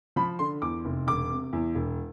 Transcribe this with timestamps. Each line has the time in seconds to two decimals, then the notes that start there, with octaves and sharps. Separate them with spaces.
0.16 F3 B5
0.39 D3 C6
0.62 E2 D6
0.85 F1
1.07 E1 D6
1.30 C3
1.53 E2
1.75 E1